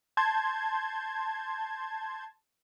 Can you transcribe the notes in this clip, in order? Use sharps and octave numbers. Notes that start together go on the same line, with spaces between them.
A5 C6 G6 G#6